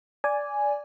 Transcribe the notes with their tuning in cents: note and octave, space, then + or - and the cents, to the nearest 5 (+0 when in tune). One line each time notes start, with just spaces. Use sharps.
D5 -10 G#5 +0